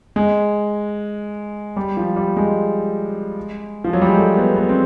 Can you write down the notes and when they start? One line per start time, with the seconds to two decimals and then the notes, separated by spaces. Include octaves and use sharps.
0.16 G#3
1.76 G3
1.97 F3
2.16 G3
2.37 G#3
3.84 F3
3.93 F#3
4.01 G3
4.09 G#3
4.17 A3
4.37 B3
4.56 B3
4.69 C4